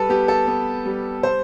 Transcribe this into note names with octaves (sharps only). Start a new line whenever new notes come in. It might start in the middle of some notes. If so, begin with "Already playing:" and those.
Already playing: G3 A4 B4
B3 G4
A4
B3
G3
C5